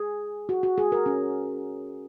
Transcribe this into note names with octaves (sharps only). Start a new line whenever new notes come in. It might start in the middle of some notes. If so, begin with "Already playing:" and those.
Already playing: G#4
F#4
F#4
G#4
A#4
C#4